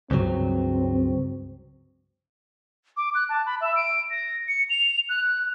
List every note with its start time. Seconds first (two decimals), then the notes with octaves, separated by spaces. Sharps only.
0.11 C#2 G2 F#3 C4
2.97 D6
3.15 F#6
3.29 A5
3.46 B5
3.61 E5
3.76 D7
4.11 A#6
4.48 C#7
4.70 F7
5.09 F#6